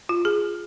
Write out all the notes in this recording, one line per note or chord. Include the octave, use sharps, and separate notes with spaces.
F4
G#4